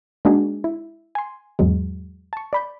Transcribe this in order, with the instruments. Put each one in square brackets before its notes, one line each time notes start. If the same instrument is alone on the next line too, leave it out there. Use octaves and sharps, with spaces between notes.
[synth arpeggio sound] G#3 A#3 D4 D#4 F#4 G#4
E4
G#5 C6
E2 G#2 F#3 G#3
A5 C#6
D5 B5 G6